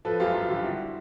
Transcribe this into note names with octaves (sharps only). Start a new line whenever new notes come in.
F3 A4 B4
F#2 F4 G4
F#2 F4
D3 F4 G4
G3 E4 F#4